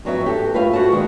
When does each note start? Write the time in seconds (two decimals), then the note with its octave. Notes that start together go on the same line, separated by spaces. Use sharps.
0.05 F2 F#3 B3 E5
0.26 G4 A4
0.54 F4 G4 B4 C#5 E5 F5
0.73 F#4 C5 A5
0.92 A#2 D#3 G#3